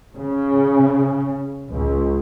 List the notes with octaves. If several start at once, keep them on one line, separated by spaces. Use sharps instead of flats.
C#3
C#2